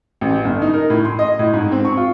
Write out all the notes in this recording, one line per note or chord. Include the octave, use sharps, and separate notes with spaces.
A1
G1
D#4
A#4
A2
C6
D#5
A2
G#2
C4
C#6
F4